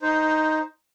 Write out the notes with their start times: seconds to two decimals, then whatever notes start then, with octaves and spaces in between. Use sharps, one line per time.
0.02 D#4 C5